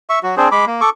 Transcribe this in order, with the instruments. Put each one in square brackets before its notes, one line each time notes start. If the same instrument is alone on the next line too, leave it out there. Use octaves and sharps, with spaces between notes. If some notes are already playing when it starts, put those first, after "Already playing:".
[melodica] E5 C#6
F#3 F#4
C4 D4 G#4 C5
G#3 B5 D6
A#3
A4 C#6 D6